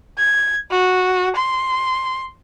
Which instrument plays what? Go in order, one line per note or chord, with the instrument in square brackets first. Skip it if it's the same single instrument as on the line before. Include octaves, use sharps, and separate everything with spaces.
[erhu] G#6
F#4
C6